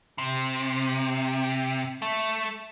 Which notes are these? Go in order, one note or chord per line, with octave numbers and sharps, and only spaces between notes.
C3
A3